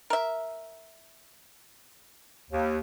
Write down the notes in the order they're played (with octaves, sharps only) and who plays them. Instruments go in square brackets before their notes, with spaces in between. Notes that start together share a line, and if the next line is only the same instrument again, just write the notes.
[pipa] A#4 E5
[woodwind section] D#2